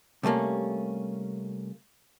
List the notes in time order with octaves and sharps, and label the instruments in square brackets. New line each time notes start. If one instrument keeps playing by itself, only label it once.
[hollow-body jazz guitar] C3 G3 A3 A#3 C#4